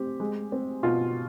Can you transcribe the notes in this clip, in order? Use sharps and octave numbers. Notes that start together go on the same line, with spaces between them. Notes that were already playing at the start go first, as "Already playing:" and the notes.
Already playing: C4 G4
G#3
C4
B2 F4